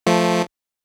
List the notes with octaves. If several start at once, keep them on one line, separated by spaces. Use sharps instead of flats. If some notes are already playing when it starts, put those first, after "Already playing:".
F3 A3